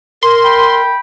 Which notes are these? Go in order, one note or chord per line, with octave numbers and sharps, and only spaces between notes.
A#4 C6
G5 B5